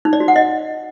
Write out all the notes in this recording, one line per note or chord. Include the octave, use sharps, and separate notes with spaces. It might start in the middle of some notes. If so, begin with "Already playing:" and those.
D#4
D5
F#4
F#5
D#5